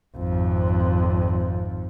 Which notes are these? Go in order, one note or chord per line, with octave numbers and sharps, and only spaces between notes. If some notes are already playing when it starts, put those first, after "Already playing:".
G#1 F2